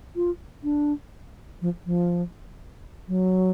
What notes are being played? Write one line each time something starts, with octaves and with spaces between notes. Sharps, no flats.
F4
D4
F3
F3
F#3